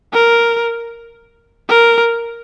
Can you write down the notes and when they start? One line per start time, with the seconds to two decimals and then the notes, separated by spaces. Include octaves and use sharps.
0.13 A#4
1.69 A#4